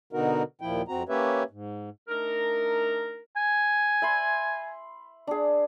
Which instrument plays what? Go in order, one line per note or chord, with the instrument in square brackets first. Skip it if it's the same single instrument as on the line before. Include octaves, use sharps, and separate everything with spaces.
[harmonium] B2 D3 B3 D#4 F#4 A#4
D#2 A#2 F3 E4 G5
F2 C4 F#4 A#5
A#3 C#4 G4 B4 C#5 E5
G#2
[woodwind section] A3 D4 D#4 A#4
[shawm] G#5
[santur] E5 B5 C6
D4 G#4